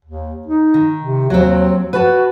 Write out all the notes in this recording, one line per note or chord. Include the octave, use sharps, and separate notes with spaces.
D#2
D#4
D#3
C3
D#2 F#3 C4
F#4 B4 A5